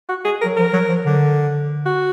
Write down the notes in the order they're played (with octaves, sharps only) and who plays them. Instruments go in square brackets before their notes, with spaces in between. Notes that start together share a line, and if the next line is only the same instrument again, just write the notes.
[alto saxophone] F#4
G#4
A#4
[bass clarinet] F#3
[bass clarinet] F3 [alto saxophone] A#4
[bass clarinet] F#3
F3
D3
[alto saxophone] F#4